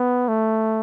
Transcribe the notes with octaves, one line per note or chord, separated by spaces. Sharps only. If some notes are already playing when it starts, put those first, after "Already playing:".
Already playing: B3
A3